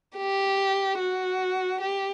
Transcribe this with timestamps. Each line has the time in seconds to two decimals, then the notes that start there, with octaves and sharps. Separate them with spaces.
0.17 G4
0.99 F#4
1.81 G4